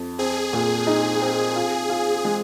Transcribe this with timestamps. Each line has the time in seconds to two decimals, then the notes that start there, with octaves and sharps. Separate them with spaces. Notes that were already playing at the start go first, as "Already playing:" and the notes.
Already playing: F2
0.19 C4 G#4
0.53 A#2
0.87 D#4
1.22 C4
1.56 F4
1.89 F4
2.25 G#3